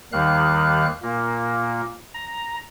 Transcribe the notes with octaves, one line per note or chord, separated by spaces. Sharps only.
D#2 D#3 G3 F5 F#6
A#2 A#3
A#5